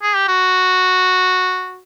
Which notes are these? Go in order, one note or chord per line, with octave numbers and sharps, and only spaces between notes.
G#4
G4
F#4